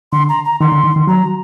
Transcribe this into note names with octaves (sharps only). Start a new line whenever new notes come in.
D3 C6
A#5
A#5
D#3 C6
D3
D#3
D#3
F#3 A#5